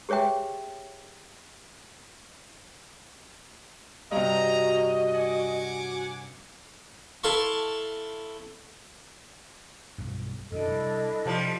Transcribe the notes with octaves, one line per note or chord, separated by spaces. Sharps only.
G4 G#4 C#5 E5 G5
G2 C3 F#4 D#5 A#5
F#5 G#5 D6
E4 A4 F5 A5 C6 C#6
B1 G2
F#2 B2 D#3 D4 E4 A4 D#5
C3 G3
C3 F3 G3